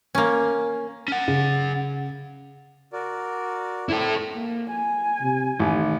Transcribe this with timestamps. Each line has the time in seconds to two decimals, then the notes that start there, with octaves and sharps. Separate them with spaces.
0.15 A#3 C#4
1.08 C#4 F#5
1.28 C#3
2.93 F#4 A#4 D5
3.89 C4 E4 A4
4.34 A#3
4.70 G#5
5.21 C3
5.59 A1 D#3